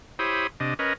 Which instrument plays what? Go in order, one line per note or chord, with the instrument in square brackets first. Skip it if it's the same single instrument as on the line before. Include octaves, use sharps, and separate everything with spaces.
[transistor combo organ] E4 G4 C5 C#5 B5 D#6
C3 D4 D#5
C#4 A#4 B4 D#5